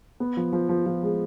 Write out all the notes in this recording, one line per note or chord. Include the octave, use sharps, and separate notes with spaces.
B3
F3
F3
F3
F3
G#3